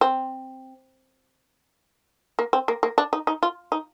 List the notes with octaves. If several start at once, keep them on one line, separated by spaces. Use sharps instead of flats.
C4
A#3
C4
A#3
A#3
D4
D#4
D#4
F4
D#4